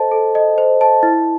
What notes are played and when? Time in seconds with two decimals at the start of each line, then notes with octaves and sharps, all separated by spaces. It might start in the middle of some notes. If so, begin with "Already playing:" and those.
Already playing: A4 C5 D#5 A5
0.12 A4
0.35 D#5
0.58 C5
0.81 A5
1.03 E4